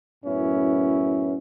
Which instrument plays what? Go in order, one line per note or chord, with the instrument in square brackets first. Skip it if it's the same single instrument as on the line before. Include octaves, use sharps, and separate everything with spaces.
[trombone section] F#2 A2 B3 C#4 E4